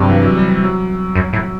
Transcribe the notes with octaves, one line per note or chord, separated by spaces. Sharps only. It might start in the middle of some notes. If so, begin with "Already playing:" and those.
Already playing: G2 C3 F#3 G3
E3
F#3
G3
G3
F#3
F#2
A2